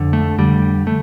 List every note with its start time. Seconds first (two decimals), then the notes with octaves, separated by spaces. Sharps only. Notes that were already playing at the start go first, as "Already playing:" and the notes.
Already playing: F2 D3
0.13 A3
0.38 F2 D3 G3
0.87 A3